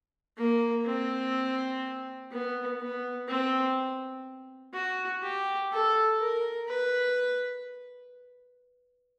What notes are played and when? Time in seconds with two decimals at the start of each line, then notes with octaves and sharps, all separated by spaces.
0.37 A#3
0.86 C4
2.31 B3
2.80 B3
3.28 C4
4.74 F#4
5.23 G4
5.72 A4
6.20 A#4
6.68 B4